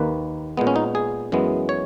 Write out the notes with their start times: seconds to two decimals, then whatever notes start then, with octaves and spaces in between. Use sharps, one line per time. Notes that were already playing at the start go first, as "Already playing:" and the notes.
Already playing: D#2 D#3 A#3 B4
0.57 A#2 G#3 B3
0.67 C#4
0.76 D#4
0.95 G#4
1.32 F#2 E3 G#3 B3
1.69 C#5